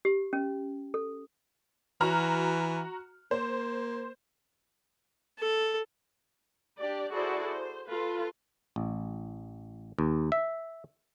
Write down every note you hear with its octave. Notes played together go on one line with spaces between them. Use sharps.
G4
C#4
A4
E3 F#4 A#5 F6
A#3 C5
A4
D4 G4 D5
E4 F#4 G#4 A4 C5 D5
C5
F4 A4 B4
A1
D#2
E5